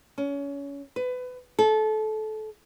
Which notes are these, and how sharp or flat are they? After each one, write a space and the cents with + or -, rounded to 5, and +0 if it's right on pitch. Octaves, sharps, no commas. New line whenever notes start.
C#4 +25
B4 +25
A4 -25